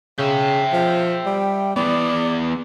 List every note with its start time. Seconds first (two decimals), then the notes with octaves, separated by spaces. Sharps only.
0.18 C#3 E5 G5
0.73 F3
1.26 G3
1.76 E3 B3 D5